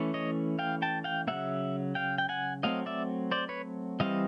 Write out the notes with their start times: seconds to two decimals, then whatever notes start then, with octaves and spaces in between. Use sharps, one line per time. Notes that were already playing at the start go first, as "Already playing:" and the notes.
Already playing: E3 A3 C#4
0.14 C#5 D#5
0.59 F5 G5
0.82 G5 A5
1.04 F5 G5
1.27 C#3 F#3 A#3 E5 F#5
1.95 F5 G5
2.18 G5
2.29 F#5 G#5
2.63 F#3 A3 C4 D#5 F5
2.86 D5 E5
3.31 C5 D5
3.49 B4 C#5
4.00 E3 G3 C4 D#5 F5